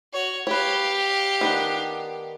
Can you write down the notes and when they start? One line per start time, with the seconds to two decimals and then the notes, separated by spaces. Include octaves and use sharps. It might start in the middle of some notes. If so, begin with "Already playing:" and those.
0.13 F#4 C#5
0.47 G4 B4 C#5 F5
1.41 D#3 B3 D4